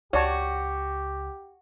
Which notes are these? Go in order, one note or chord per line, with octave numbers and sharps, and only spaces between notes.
C#2 F#4 G4 C#5 D5 A5